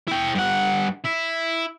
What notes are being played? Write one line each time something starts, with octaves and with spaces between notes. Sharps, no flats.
E4 G5
G2 F#5
E4